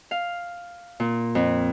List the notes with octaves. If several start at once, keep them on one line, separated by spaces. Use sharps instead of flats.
F5
A#2
F2